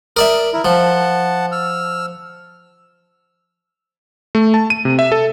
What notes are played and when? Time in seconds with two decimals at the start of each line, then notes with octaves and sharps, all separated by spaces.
0.17 A#4 D5 E5 D#6
0.53 E4 A#4
0.65 F3 F#5 A5
1.52 E6 F6
4.35 A3
4.54 A5
4.70 D#7
4.85 C3
4.99 E5
5.12 A4